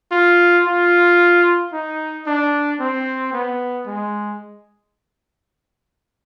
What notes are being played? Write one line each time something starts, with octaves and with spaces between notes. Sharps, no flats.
F4
F4
D#4
D4
C4
B3
G#3